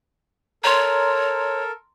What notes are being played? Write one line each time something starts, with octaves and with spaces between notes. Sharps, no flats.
A4 A#4 C#5 A#5 C6